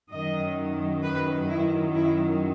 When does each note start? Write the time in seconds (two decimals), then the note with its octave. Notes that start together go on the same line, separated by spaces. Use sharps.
0.11 F#2 D#3 F#3 D#5
1.04 B4
1.49 E4
1.95 E4